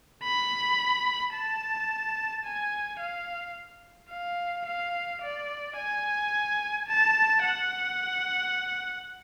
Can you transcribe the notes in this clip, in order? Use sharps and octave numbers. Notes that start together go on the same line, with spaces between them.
B5
A5
G#5
F5
F5
F5
D5
G#5
A5
F#5